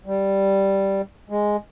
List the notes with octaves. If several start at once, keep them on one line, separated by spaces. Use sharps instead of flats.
G3
G#3